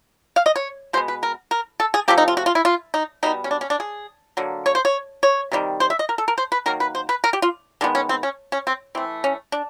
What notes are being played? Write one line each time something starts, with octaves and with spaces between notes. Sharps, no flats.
F5
D#5
C#5
B2 G#3 B3 C5
B4
A#4
A#4
A4
G#4
C3 F3 A3 G4
D#4
F4
F#4
F4
E4
F4
D#4
B2 G3 B3 D#4
C#4
D4
C#4
D4
G#4
D3 F#3 A#3
C#5
C5
C#5
C#5
C3 D#3 G3
C5
E5
D#5
A#4
A4
A#4
C5
B4
D#3 F#3 A#3 A#4
B4
C5
B4
A#4
G4
F4
D#3 G#3 B3 D4
C#4
C4
C#4
C#4
C4
E3 A3 C4
C#4
D4